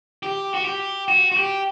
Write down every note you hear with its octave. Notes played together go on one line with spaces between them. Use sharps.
G4
F#4
G4
F#4
F#4
G4